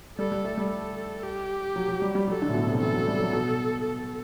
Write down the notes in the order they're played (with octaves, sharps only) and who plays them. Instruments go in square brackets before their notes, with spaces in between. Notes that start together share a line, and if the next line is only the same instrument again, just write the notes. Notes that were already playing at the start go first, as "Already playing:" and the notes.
[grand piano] G3 [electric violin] A4
[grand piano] G3
A3
G3
[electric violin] A4
G4
[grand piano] F#3
F#3
G3
G3
[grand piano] F#3 [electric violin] A4
[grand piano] D3
A2
B2
C3
[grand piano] E3 [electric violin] A4
[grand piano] F#3
G3
F#3
B2
[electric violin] A4